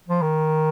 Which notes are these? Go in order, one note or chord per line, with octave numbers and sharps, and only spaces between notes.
F3
D#3